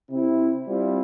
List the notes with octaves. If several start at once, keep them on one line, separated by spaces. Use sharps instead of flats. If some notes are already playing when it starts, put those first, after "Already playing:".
C3 C4 E4
G3 C4 E4 F4